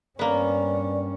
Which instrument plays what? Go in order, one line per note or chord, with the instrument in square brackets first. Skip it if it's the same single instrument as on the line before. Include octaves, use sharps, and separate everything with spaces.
[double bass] G2 C#4 [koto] A#3 B3 [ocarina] D5